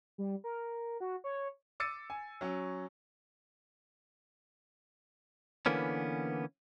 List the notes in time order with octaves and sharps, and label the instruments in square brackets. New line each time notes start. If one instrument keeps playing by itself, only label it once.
[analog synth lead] G3
A#4
F#4
C#5
[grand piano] D6 E6 A6 C#7 D#7
G#5
F#3 C#4
[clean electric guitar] D3 E3 A#3 B3 C#4